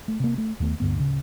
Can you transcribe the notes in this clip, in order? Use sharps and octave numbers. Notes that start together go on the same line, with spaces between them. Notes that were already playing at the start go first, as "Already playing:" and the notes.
A3
C3 A#3
A3
D#2 D#3 A3 B3
D2 G2 B3
D1 G#1 C#3 C#4